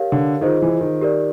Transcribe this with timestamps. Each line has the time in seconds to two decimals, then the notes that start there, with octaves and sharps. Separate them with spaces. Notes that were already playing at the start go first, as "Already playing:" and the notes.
Already playing: G4 A#4 C#5 F5
0.12 D3
0.41 D#3 F4 G#4 C5 D#5
0.62 E3
0.81 D#3
1.01 G4 A#4 D5